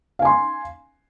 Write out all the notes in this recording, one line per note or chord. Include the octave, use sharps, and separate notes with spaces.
F5 G#5 C6